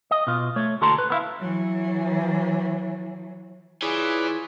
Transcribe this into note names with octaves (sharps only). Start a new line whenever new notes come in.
D#5
B2 F4
A3 C#5
D2 F#4 A4 A5 A#5 C6
B4
B3 E4 F5
E3 F#3
E3 F4 G#4 B4 C#5 D5